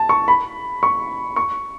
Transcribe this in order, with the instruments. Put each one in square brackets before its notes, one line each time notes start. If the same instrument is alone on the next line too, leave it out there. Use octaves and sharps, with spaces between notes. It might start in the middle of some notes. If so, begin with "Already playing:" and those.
Already playing: [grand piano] A5
C#6
B5
C#6
C#6